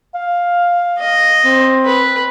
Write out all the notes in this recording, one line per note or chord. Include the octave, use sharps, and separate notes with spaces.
F5
D#5
C4
B4